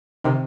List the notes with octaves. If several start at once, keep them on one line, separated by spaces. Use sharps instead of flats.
C3 D#3